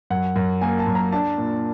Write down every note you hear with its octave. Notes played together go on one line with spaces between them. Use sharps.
F#2 F#5
F#2
A#3 G#5
A5
F#2
A#5
D4 A5
A#2